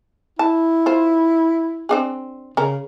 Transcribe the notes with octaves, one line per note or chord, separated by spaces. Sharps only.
E4 A5
F4 C5
C4 D4 G#4
C#3 C#4 A#4